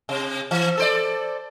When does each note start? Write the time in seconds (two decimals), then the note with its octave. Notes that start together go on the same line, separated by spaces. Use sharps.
0.09 C3
0.51 E3
0.77 A4 C5 D5